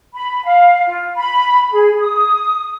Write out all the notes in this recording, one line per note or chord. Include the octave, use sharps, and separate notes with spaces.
B5
F5
F4
B5
G#4
D#6